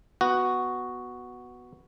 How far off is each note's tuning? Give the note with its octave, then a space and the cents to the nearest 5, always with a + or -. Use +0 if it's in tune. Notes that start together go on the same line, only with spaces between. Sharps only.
B3 +0 F#4 +0